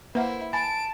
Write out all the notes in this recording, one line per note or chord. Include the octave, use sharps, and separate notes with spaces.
A#3 E4 B4 C5 E5 F#5
G#5 A5 B5 D7